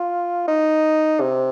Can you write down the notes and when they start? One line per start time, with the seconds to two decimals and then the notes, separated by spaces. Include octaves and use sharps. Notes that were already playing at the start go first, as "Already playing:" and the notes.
Already playing: F4
0.48 D#4
1.20 C3